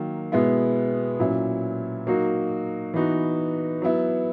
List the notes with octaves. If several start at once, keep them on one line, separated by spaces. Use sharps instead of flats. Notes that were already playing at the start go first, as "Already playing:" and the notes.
Already playing: D#3 F#3 A#3
B2 G#3 B3 E4
A#2 F#3 C#4 E4
F#3 A#3 D#4 F#4
E3 B3 D#4 F#4
F#3 B3 E4